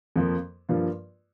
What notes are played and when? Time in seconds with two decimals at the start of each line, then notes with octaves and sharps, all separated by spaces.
0.16 F2 F3 A#3
0.69 G2 F3 A#3 F4